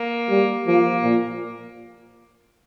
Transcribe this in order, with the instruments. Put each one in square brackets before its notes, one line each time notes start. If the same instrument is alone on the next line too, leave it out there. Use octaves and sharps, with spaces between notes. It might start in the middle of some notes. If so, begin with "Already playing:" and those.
Already playing: [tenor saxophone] A#3
[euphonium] G3
[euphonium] F3 [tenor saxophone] A#3
[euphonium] A#2